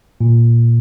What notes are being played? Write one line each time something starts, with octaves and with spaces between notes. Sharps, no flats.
A#2